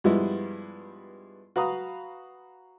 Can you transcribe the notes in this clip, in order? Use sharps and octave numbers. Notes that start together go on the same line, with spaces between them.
G2 F3 G3 G#3 B3 E4
F#4 B4 F5 A#5 D#6